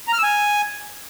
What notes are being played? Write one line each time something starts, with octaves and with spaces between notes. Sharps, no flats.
A#5
F6
E6
G#5